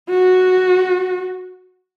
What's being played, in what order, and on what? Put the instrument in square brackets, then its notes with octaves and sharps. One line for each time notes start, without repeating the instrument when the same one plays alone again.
[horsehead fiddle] F#4